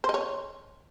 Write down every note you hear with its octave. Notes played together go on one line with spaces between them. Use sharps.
C5
D#5
C#5